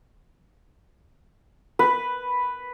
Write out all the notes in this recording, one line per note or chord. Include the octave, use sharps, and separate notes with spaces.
B4